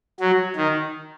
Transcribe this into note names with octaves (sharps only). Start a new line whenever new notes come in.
F#3
D#3